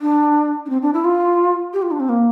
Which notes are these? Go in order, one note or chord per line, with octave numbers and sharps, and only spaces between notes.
D4
D4
C4
D4
E4
F4
G4
F4
D4
C4
A#3